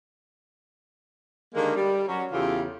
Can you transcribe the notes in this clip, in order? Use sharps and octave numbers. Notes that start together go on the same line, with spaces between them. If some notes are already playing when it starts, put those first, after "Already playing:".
D3 D#3 G3 G#3 A#3
G3
F#3 C#4 F#4
E2 C#3 E3 F4 G4 A4